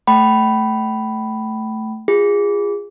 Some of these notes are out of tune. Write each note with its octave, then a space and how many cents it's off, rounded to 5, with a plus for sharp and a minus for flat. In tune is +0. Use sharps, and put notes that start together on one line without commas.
A3 +0 G5 -35 B5 +0
F4 +0 G#4 -25